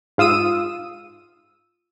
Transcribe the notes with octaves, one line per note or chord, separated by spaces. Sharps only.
G#2 F4 D#6 E6 D#7